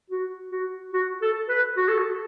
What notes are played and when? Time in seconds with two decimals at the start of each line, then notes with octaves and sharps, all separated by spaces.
0.10 F#4
0.51 F#4
0.93 F#4
1.22 A4
1.49 B4
1.77 F#4
1.88 A4
1.98 F#4